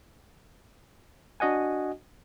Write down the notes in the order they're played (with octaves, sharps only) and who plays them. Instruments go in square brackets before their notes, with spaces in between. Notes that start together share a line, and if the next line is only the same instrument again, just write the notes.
[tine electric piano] D4 F#4 D#5 F#5 G#5